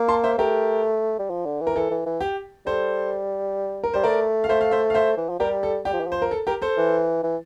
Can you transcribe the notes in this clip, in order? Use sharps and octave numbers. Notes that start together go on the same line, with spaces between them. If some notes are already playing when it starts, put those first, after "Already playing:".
Already playing: A#3
A5 C6
C5 E5
A3 G4 A#4
G3
F3
D3
E3
A#4
E3 A4
E3
E3
G4
G3 A4 C5
A#4
G3 C5
A3 A#4 D5
F5
A3 C5 E5
F5
C5 E5
F5
C5 E5
E3
F3
G3 G4 A#4
A4
G3 G4
F3
E3
F3 C5
A#4
A4
G4 A#4
A4 C5
E3
E3